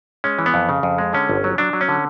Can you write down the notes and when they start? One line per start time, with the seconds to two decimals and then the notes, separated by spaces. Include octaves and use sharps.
0.24 G#3 C#4
0.39 E3
0.46 B3
0.54 F2
0.69 C#3
0.83 F2
0.98 G#3
1.13 D3 C#4
1.29 G1
1.44 F#3
1.58 F#3 D4
1.73 F#3
1.81 C#4
1.89 D3